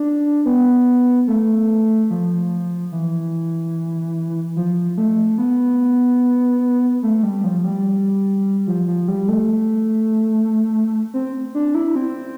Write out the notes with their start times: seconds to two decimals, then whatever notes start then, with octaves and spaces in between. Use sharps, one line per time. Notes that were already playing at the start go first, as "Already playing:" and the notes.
Already playing: D4
0.46 B3
1.28 A3
2.10 F3
2.92 E3
4.56 F3
4.98 A3
5.38 B3
7.03 A3
7.23 G3
7.44 F3
7.64 G3
8.67 F3
8.87 F3
9.08 G3
9.28 A3
11.14 C4
11.55 D4
11.75 E4
11.96 C4